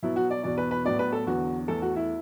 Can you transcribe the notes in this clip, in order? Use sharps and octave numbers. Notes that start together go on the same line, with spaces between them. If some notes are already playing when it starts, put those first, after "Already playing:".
B2 F#3 B3 E4
F#4
D5
E2 B2 B3 D5
B4
B4
A2 F#3 B3 D5
B4
A4
E2 D3 F#3 B3 F#4
E2 E3 A3 A4
F#4
E4